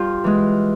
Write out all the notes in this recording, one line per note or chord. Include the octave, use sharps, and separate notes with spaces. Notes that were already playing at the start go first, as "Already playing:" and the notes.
Already playing: G2 F4 G4
E3 G#3